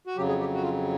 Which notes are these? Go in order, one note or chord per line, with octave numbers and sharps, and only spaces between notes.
F#4
F2 C#3 F#3 G4
G#4
G4
F#4
F4